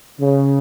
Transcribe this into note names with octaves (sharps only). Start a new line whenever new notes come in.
C#3